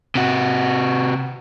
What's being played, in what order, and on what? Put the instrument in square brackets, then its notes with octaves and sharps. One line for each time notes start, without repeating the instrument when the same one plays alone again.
[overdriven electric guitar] C3 F#4